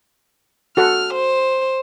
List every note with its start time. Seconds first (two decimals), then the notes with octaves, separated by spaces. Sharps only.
0.77 F#4 A4 F#5 F6
1.14 C5